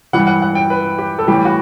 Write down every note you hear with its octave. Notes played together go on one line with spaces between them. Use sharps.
G2 E3 G3 F#5
F#5
F#5
G5
B4
G4
A4
A2 E3 G3 G4
F#4